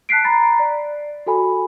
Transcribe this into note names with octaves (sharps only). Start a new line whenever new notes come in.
A5 F#6 B6 C7 D7
A#5 B5 A6
D5
F#4 A4 G#5 B5